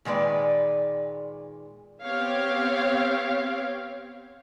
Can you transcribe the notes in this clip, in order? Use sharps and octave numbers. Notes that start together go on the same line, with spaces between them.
A#2 D#3 G#3 B4 D5
B3 C4 G4 C#5 F5